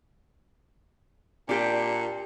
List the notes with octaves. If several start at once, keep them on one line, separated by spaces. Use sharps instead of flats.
A#2 D4 G4